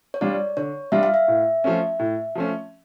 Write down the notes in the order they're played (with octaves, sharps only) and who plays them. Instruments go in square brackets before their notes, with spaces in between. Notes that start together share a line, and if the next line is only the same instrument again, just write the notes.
[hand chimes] C#5
[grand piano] G3 D4 F4 [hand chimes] D5
[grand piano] D3 [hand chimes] C#5
[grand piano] G3 D4 F4 [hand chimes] E5
[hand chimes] F5
E5
[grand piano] A2
F3 A3 C#4
A2
F3 A3 C#4